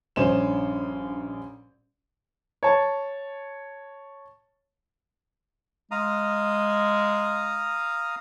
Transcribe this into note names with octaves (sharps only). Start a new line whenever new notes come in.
A#1 G2 C#4 C5 E7
C#5 A5
G#3 F5 A#5 D#6